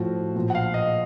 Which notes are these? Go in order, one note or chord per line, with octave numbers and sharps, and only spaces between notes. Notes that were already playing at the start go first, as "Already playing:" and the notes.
Already playing: A2 F3 F#4
A#2 F3
F#5
F5
D#5